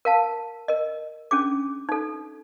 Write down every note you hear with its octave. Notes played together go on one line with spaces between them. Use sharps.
A#4 F5 A5
A#4 D#5
C#4 D4 G#4 D6
D#4 A4